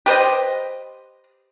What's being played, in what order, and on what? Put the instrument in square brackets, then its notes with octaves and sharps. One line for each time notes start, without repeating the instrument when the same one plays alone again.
[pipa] G4 B4 C5 D#5